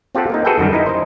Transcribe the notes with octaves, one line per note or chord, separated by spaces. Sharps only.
C4 F4 G4 A4 F#5
A#3 C4 D#4
F#4 G#4 A4 B4 E5 G5
F#2 D3 D#3 G3
D#4 E4 A#4 D#5
D#4 C5